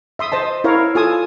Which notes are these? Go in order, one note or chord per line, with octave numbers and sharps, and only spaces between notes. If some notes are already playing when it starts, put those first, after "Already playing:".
E5 C6 D#6
C5 D#5 A5
E4 A#4 C#5 F5
F4 A4 G#5 A5 D#6